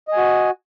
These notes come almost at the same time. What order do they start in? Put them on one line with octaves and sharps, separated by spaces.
D#5 G#5 F#4